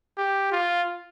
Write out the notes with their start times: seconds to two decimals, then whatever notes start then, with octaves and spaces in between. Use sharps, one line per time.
0.18 G4
0.52 F4